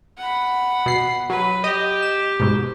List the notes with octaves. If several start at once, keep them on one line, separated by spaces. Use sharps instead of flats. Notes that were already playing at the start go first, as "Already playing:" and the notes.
F#5 B5
B2 C7
F#3 B4
G4 D#5
E7
G#2 B2